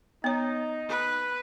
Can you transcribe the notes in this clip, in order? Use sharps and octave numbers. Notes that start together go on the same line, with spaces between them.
B3 D#4 C#5
B4